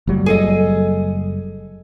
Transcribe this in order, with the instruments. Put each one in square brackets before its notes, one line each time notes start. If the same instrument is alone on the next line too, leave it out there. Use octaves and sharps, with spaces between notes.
[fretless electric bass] F#1 F#3 G3
[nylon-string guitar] G#4 A4 D#5